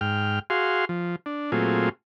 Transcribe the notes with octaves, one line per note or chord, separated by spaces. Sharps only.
G#2 G5 F6
F#4 G#4 F5 C6
F3
D4
A#2 F#3 A3 C4 F4 G#4